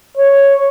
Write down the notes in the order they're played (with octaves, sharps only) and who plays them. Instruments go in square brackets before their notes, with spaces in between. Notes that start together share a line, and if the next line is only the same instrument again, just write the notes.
[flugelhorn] C#5